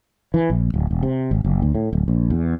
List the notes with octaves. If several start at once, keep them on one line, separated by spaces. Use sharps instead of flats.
E3
A#1
D1
E1
C3
G#1
F#1
D2
A2
D1
A#1
E2